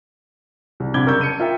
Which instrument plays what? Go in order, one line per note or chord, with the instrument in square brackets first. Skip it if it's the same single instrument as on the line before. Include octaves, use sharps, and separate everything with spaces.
[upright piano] C2
A#1 C3 B5 D6 G#6 G7
F#1 A#4 C#6 E6 G6
A5 C#7 D#7
F4 A#4 E5 G5